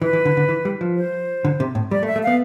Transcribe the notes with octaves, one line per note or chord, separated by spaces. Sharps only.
E3 B4
E3
D3
D3
E3
G3
F3
C5
D3
C3
A2
G3 D5
A3
E5
A3
B3 F5